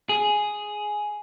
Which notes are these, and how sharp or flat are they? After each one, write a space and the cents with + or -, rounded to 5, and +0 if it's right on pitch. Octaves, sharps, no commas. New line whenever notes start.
G#4 +5